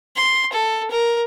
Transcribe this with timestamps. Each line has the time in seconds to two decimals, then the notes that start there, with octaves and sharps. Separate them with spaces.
0.16 C6
0.53 A4
0.91 A#4